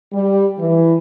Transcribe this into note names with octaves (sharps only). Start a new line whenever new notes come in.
G3
E3